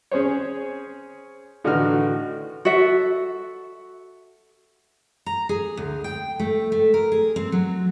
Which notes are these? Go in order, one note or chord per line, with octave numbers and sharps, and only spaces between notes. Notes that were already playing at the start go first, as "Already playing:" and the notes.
C#4 G#4 C5 C#5
A2 D3 E3 D#4 F#4 F6
F#4 A4 E5
A#5
G#4
D2
G5
A3
A3
A#4
G#4
C4
F#3